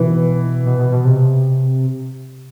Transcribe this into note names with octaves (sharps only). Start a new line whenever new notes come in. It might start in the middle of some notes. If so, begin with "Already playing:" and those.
Already playing: B2 E3
B2
B2
B2
C3